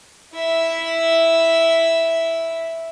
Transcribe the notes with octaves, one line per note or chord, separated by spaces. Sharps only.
E4 E5